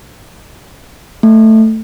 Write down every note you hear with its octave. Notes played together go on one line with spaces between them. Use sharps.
A3